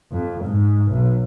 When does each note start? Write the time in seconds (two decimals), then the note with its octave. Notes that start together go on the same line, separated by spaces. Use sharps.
0.12 F2
0.44 G#2
0.91 B1